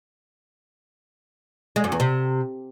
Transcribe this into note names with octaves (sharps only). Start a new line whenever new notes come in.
G#3
F#2
E2
C3